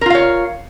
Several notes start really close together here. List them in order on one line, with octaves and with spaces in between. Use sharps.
A#4 F4 F5 C#5